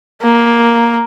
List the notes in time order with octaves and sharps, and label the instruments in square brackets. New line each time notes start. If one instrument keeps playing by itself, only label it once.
[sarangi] A#3